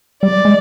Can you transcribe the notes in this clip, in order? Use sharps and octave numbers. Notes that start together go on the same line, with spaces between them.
G3 D5
G#3